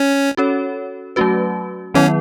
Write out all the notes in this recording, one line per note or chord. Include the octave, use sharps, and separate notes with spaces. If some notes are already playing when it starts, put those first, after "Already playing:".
Already playing: C#4
C#4 F#4 A4 C#5
F#3 A3 C#4 F#4 B4
D#3 F#3 B3 C#4 E4